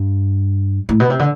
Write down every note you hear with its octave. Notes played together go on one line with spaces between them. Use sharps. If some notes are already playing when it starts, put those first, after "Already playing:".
Already playing: G2
A2
B2
C3
D3